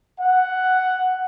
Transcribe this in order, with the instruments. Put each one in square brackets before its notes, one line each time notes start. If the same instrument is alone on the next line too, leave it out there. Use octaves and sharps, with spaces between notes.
[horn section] F#5